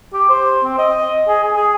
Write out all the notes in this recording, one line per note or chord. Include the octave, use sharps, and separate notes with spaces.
G4
C5
C4
D#5
G#4
G#4
G#4